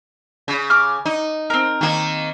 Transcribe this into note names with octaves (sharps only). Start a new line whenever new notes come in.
C#3
D6 F6
D#4
C4 A#4
D#3 A#3